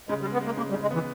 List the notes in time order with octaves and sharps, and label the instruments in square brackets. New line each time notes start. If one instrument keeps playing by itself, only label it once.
[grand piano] C#3 [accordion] G#3
[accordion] G3
[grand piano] G#3
[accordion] B3
[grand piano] G#3 [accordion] A#3
[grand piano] C#3 [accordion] A#3
[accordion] G3
[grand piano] C#3
[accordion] G#3
[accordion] E3 [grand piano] B3